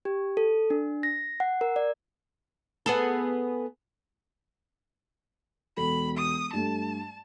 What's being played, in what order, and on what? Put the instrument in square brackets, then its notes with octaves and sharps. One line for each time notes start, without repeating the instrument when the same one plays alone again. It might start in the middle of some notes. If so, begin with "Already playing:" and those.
[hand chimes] G4
A4
D4
A#6
F#5
A#4
D5
[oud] B3 G#4 A4
[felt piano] E1 A4 [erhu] B5
[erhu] D#6
[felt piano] G2 A3 [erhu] A5